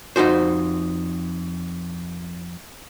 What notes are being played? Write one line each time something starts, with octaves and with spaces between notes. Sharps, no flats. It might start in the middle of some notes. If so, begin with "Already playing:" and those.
F2 D#4 F#4 C5